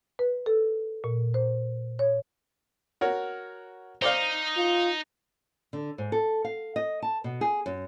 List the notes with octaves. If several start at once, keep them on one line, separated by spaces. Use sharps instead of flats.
B4
A4
A#2
C5
C#5
F#4 A#4 C#5
D#4 C5 D5 F5
F4
D3
G#2
A4
F5
D#5
A5
B2
G#4
F#2